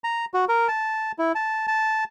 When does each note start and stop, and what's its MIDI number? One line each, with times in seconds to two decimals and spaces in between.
0.04 0.25 82
0.34 0.45 66
0.49 0.68 70
0.68 1.12 81
1.19 1.32 64
1.35 1.67 81
1.67 2.04 81